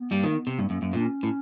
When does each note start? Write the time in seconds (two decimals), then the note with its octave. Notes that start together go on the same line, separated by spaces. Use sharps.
0.01 B3
0.11 G2 G3 A#3
0.23 D#3
0.30 A#3
0.35 B3
0.47 C3
0.58 G2 A#3
0.70 F#2
0.82 F#2
0.93 A#2 D4
1.05 C#4
1.23 A2